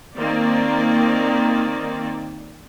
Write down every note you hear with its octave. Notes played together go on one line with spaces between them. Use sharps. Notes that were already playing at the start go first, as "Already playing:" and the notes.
D#3 A#3 C4 D5